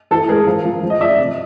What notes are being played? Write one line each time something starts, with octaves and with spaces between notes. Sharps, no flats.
E3 A4
G#3 G#4 A#4
F3
F3
F3
D#5
F3 D5 E5
C3